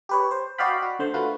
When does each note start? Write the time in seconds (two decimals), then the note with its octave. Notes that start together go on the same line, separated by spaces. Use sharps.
0.09 G4 B4 C#5
0.31 C5
0.58 F#4 D5 D#5 F5 G5 B5
0.82 F#4
0.99 D3 A3 C5
1.14 A3 F4 F#4 B4